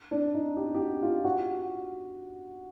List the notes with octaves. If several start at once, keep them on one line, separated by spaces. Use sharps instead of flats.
D4
D#4
G4
G4
F#4
F4
F#4